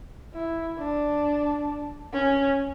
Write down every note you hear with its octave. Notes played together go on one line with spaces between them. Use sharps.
E4
D4
C#4